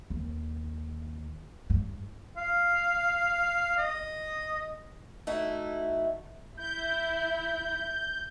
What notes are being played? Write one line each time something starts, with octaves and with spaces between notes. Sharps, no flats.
D#2
G2
F5
D#5
A3 D#4 E4 F#4
E4 G6